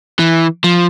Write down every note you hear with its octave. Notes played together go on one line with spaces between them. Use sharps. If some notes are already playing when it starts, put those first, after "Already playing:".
E3
F3